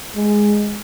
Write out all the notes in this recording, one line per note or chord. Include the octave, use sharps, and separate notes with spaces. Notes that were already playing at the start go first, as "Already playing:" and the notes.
G#3